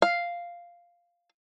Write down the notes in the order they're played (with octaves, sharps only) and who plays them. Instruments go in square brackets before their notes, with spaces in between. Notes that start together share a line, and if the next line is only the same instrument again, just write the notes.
[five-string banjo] F5